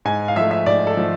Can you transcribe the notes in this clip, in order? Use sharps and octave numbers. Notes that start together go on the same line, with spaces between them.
G#2 G#5
F5
F3 A3 E5
E5
G#2 D5
A4
F3 A3